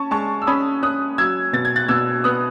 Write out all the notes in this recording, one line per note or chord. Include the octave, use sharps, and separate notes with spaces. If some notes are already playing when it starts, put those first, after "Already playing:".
Already playing: C#4 A5 C#6
G#3 A5 C#6
E6
C#4 B5 D#6
C#4 D#6 F#6
F#3 E6 G#6
B2 A6
G#6
F#6 A6
B2 E6 G#6
B3 D#6 F#6